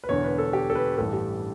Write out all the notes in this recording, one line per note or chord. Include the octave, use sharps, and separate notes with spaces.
B4
E1 E2 D3 C#5
B4
A4
G4
A4
B4
A1 G2 E3 G3 A4
G4